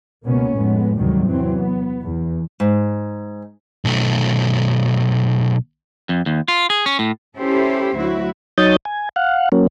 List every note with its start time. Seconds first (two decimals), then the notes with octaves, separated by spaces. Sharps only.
0.25 C#2 B2 A#3 B3 C#4
0.55 F2 A2 G#3 B3
0.97 D2 G#2 C3 D#3 F#3 G3
1.27 E2 E3 F#3 C4
1.59 B3
2.03 E2
2.60 G#2
3.85 B1 A3
6.09 F2
6.26 D#2
6.48 F4
6.70 G#4
6.86 C#4
6.99 A2
7.36 C#4 E4 G4 A4 C5
7.96 D2 F#3 E4 F#4
8.58 F#3 D#4 C#5 D#6 G6 A6
8.85 G#5
9.16 F5 F#5
9.52 F#3 A#3 C#4